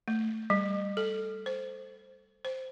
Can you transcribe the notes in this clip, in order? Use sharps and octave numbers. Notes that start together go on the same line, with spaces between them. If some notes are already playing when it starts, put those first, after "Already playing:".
A3
G3
A4
C5
C5